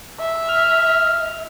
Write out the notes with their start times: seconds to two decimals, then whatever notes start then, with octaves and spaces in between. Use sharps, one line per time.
0.19 E5
0.49 F6